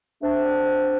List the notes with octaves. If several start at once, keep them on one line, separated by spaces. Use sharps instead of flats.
A3 C4 D4
D3
F2